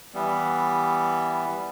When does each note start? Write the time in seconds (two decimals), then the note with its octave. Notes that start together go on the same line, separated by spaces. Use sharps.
0.14 E3 G3 B3